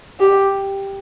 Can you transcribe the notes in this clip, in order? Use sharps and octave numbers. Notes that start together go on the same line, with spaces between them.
G4